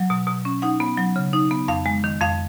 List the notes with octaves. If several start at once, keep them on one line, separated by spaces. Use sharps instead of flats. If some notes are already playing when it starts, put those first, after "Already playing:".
Already playing: F#3
B2
B2
C#4
D#4 F#5
B3
F#3
C#3
D#4
B3
F2 F5
G#3
D#3
F2 F5